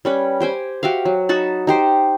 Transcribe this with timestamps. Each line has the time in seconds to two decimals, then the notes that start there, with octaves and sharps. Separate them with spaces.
0.05 G3 C#4 B4
0.40 G4 C5 G5 G#5
0.83 F#4 G4 E5 F5
1.05 F#3
1.29 D#4 F#4 A5 B5
1.67 D#4 G4 C5